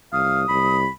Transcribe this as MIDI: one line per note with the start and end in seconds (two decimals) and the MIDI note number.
0.13 0.47 36
0.13 0.42 77
0.13 0.77 87
0.49 0.86 36
0.49 0.90 83